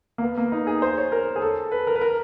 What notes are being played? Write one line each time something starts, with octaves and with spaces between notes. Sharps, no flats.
A#3
B3
A#3
D#4
G#4
C5
C#5
A#4
G#4
A4
B4
A#4
B4
A#4